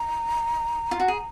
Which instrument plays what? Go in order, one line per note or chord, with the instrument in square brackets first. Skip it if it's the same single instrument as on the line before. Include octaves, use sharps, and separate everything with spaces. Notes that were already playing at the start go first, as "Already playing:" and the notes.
Already playing: [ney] A#5
[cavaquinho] F4
F#4
G#4